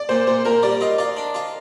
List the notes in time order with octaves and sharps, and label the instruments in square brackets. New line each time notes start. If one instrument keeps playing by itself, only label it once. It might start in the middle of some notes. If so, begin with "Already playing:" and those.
Already playing: [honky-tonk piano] D5
[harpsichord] A#2 [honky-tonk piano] C5
[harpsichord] A#2 [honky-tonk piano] C5
[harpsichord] A#2 [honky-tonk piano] A#4
[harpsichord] G3 [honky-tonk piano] D5
[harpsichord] F4 [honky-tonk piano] D#5
[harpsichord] F4 [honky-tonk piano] D5
[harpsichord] D4
F4